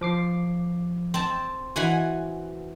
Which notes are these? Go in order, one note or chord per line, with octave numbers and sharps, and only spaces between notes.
F3 D6 C7
C4 A5
E3 F#4 F#5 G#5